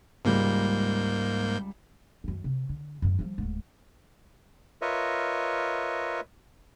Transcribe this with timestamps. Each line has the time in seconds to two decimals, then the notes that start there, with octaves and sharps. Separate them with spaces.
0.25 C#2 G#2 G3 A#3 G6
2.24 F#2 D#3
2.44 C3
2.69 D3
3.02 F#2 E3
3.19 F3 G3
3.38 D1 G#2
4.82 F4 A#4 B4 C#5 D#5 E5